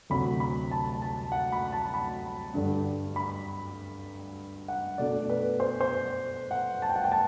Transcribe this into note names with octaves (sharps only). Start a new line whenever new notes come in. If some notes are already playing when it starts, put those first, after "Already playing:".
D2 C3 F#3 B5
B5
A5
A5
F#5
B5
A5
B5
G2 D3 G3 D4
B5
F#5
B2 A3 D4 D5
B4
C5
C5
F#5
A5
G5
F#5
G5
A5